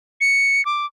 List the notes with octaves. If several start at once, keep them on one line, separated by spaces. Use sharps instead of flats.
C#7
D6